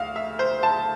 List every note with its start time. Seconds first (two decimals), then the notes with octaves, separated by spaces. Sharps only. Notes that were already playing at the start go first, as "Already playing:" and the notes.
Already playing: D2 F5
0.16 E5
0.39 C5
0.63 A5